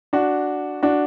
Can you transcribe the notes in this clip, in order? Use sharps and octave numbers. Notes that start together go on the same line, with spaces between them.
D4 F#4
D4 F#4